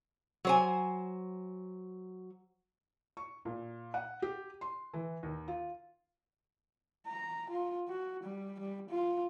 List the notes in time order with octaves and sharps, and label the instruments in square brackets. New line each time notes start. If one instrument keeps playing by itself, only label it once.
[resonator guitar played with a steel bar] F#3 C5 G#5
[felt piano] C#6
A#2
F#5
G4
C6
E3
D#2
F4
[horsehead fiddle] A#5
F4
F#4
G3
G3
F4